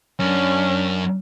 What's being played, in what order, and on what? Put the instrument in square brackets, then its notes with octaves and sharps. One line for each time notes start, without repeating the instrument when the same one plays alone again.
[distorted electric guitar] F#2 [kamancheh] C#4 D4